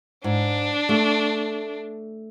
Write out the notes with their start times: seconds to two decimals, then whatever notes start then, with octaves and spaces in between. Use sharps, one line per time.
0.24 G#2 D4
0.89 A3